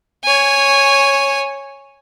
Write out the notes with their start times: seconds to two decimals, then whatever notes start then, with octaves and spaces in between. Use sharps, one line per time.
0.24 C#5 G#5